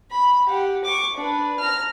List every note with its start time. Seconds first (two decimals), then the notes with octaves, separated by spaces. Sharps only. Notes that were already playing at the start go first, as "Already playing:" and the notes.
0.11 B5
0.47 G4 F#5
0.84 C#6 D6
1.16 D4 B4
1.59 A#5 F6